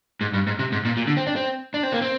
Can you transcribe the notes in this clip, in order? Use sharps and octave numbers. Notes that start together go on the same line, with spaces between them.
G#2
G2
G#2
C3
G#2
A#2
A#2
D3
C4
D4
C4
D4
C4
A#3
C4